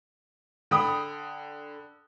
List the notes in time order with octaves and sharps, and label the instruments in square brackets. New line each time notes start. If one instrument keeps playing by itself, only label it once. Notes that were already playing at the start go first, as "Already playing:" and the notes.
[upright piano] D3 G5 B5 D#6